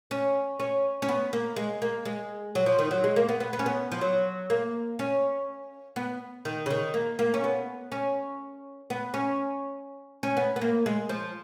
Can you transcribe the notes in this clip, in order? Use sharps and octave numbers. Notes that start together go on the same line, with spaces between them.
C#4
C#4
C#4
B3
A#3
G#3
A#3
G#3
F#3
F3
D#3
F#3
G#3
A#3
B3
B3
B3
C#4
B3
F3
F#3
A#3
C#4
B3
D#3
C#3
D#3
A#3
A#3
C#4
B3
C#4
B3
C#4
C#4
B3
B3
A#3
G#3
F3